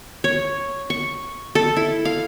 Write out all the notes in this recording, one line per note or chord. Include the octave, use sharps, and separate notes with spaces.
C#5
C#6
A4
E4
F5